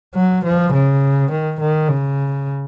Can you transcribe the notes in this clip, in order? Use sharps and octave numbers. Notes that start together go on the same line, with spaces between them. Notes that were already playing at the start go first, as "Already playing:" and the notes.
F#3
F3
C#3
D#3
D#3
C#3